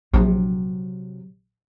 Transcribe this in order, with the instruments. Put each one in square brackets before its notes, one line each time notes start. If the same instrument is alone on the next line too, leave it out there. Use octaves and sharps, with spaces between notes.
[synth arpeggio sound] A#1 [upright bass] C3 F#3